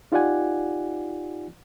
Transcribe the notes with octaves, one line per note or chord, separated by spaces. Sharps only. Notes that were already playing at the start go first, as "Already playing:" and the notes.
D#4 F4 G4 D5 F#5 G#5